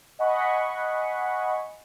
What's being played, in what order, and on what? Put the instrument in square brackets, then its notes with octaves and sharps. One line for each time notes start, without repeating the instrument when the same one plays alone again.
[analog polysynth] D#5 F#5 G#5 B5 C#6